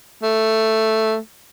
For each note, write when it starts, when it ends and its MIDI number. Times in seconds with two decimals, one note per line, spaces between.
0.23 1.18 57